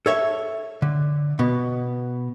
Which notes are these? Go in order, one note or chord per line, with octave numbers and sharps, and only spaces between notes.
A4 C#5 E5
D3
B2 B3